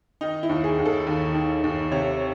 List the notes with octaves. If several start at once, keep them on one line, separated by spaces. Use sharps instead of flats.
D#3 D#4
E4
D#2
G#4
D#2
A4
D#2
D#3
D#2
C3 C#5